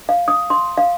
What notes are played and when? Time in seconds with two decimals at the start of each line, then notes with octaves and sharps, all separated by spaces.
0.09 F5
0.28 D#6
0.50 C6
0.78 F5